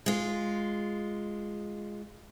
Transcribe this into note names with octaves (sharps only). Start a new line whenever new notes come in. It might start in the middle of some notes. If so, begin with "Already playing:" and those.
G#3 F4